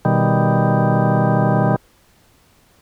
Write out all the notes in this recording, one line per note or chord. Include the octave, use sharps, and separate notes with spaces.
B2 D#3 G3